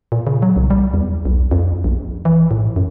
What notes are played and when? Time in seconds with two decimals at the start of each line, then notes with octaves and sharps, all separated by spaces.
0.12 A#2
0.27 C#3
0.42 F#3
0.56 C2
0.70 G3
0.94 E2
1.25 B1
1.51 F2
1.84 A#1
2.25 E3
2.51 A2
2.76 F#2